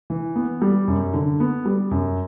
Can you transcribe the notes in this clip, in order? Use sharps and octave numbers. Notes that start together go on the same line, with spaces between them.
E3
B3
G3
F#2
D3
B3
G3
F#2